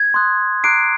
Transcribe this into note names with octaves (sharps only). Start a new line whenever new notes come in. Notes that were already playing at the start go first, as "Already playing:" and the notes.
Already playing: G#6
C6 D#6 F#6
A#5 D6 F#6 C7 D7